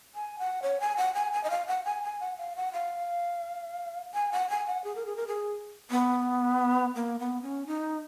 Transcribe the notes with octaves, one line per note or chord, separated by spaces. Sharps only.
G#5
F#5
C#5
G#5
F#5
G#5
G#5
D#5
F5
F#5
G#5
G#5
F#5
F5
F#5
F5
G#5
F#5
G#5
F#5
G#4
A#4
G#4
A#4
G#4
B3
A#3
B3
C#4
D#4